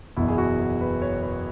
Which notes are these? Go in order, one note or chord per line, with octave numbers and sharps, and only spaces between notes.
F#1 E2 B2 E4
G#4
F#4
G#4
B4
C#5
B4